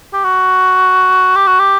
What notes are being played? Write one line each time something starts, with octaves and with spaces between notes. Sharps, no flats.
G4
F#4
G4
F#4
G4